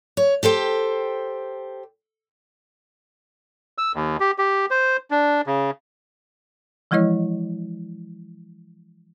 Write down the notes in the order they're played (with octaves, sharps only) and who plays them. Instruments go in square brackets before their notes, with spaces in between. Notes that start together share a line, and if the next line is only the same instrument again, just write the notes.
[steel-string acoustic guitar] C#5
G4 A4 C5 G5
[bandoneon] E6
D#2
G4
G4
C5
D4
C#3
[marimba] E3 F3 G#3 E4 C#5 D#5